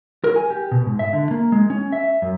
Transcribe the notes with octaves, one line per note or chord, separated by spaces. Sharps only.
A#4
G#5
G4
B2
G#2
E5
D3
A#3
G#3
C#4
E5
F#2